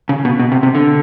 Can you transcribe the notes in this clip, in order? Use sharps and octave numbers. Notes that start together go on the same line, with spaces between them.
C#3
B2
B2
C3
C3
D3